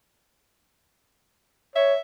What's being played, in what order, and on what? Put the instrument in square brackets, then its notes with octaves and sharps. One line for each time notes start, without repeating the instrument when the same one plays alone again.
[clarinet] C#5 [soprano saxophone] E5